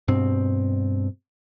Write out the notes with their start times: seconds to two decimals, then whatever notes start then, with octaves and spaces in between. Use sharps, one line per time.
0.08 G2 B2 C4